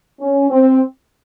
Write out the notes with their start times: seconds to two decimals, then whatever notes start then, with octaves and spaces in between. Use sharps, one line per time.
0.20 C#4
0.50 C4